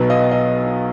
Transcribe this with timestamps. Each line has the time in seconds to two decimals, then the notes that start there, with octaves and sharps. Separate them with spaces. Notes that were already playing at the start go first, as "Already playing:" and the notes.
Already playing: B1 B2 F#3 B3
0.10 D#5 F5
0.31 D#5